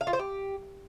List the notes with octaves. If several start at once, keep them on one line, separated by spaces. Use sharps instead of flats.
F5
F4
C5
G4